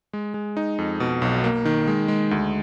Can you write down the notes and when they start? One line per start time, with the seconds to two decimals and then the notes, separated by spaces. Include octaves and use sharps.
0.13 G#3
0.34 G#3
0.57 D#4
0.78 F2
1.00 B2
1.22 B1
1.44 A#3
1.65 D#3
1.87 G#3
2.08 G#3
2.31 D2